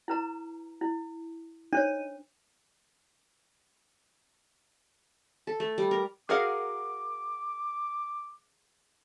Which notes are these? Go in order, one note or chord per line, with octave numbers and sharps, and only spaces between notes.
E4 B4 A#5
E4
D4 D#4 C5 C#5
A4
A3
G3
A#4
F#4 G#4 A#4 F5 F#5 D6